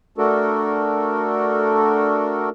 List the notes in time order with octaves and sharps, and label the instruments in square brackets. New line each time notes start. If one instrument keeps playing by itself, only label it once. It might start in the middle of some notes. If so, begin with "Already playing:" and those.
[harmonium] A3 D4 F#4 A4 A#4